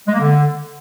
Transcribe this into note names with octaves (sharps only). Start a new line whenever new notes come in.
G#3
A#3
D3